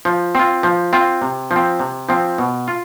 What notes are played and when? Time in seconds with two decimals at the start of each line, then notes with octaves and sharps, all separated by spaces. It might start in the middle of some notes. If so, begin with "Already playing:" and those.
0.05 F3
0.35 C4 F4
0.63 F3
0.93 C4 F4
1.22 C3
1.51 F3
1.56 C4
1.79 C3
2.09 F3 C4
2.38 B2
2.68 F4